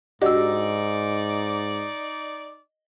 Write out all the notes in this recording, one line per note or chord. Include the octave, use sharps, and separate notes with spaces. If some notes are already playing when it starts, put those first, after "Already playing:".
G#2 D4 D#4 F#4 G4 D5 D#5 E6